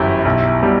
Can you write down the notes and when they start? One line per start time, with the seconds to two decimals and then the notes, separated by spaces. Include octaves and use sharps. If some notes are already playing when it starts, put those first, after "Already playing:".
Already playing: G1 F#2 E3 E4 G4
0.25 B1
0.62 B2 G3